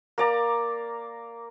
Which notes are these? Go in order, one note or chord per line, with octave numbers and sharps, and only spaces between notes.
A#3 D5 A#5